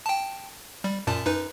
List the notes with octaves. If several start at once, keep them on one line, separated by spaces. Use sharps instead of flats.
G5 A5
G3
F#2 A#2 A5
F#2 D#4 B4